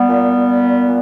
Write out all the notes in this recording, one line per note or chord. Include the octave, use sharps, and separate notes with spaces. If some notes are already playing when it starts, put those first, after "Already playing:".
Already playing: G3 B3
A#2
A#2
A#2
A#2